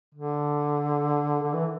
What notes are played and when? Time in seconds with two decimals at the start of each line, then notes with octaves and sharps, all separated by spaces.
0.15 D3
1.43 D3
1.54 E3